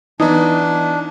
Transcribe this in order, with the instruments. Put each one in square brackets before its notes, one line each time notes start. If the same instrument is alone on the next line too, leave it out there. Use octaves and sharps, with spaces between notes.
[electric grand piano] E3 B3 [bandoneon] D4 [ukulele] D#4